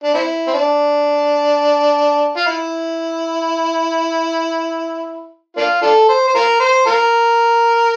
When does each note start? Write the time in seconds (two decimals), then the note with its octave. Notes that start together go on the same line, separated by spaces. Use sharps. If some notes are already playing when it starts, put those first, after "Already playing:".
0.04 D4
0.14 C4 E4
0.47 C4
0.54 D4
2.36 F4
2.47 E4
5.57 A#3 D4 F4
5.82 D4 F4 A4
6.09 C5
6.27 C5
6.35 F4 A#4
6.60 C5
6.86 F4 A#4